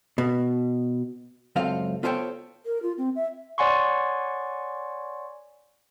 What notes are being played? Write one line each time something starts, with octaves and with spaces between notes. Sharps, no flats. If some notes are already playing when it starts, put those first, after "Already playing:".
B2
C#2 F#2 C4 F4 A4 F5
B3 F4 A4 C5 C#5 G5
A#4
F4
C4
E5
C#5 D5 F#5 G#5 C6 C#6